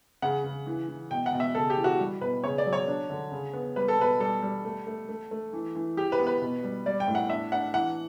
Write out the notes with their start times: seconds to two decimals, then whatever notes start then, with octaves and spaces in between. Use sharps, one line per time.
0.22 C#3 F#5
0.44 C#3
0.67 E3
0.89 E3
1.11 B2 G5
1.26 F#5
1.33 B2
1.40 E5
1.55 C#3 A4
1.70 G4
1.77 E3
1.84 F#4
1.99 G3
2.21 B2 B4
2.44 C#3 C#5
2.58 D5
2.66 F#3
2.73 C#5
2.88 D4
3.10 D3
3.32 C#3
3.53 B3
3.76 G3 B4
3.88 A4
3.98 B2 B4
4.20 G3 A4
4.42 G3
4.65 A3
4.87 A3
5.09 A3
5.31 A3
5.53 E3
5.75 E3
5.97 E3 G4
6.12 B4
6.19 B3
6.27 B4
6.42 B2
6.64 G3
6.86 G3 D5
7.00 G5
7.08 A2
7.15 F#5
7.30 D4 E5
7.52 D4 F#5
7.74 E3 F#5